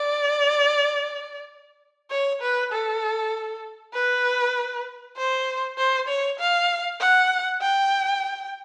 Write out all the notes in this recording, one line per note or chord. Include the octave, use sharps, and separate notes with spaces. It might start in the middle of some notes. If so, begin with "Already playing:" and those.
Already playing: D5
C#5
B4
A4
B4
C5
C5
C#5
F5
F#5
G5